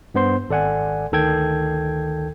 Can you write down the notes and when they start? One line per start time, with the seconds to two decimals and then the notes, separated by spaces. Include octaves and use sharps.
0.14 G2 B3 C5 C6
0.49 G#1 A4 D5 F#5 G#5
1.12 D2 D#3 A4 G5 G#6